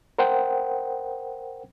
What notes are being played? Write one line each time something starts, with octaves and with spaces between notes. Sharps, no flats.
A#4 C5 F#5 G5